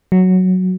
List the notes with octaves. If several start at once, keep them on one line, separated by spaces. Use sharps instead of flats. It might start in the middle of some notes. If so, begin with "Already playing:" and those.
F#3